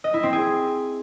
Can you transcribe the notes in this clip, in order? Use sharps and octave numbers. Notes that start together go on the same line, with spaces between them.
D#5
E4
C4
G#4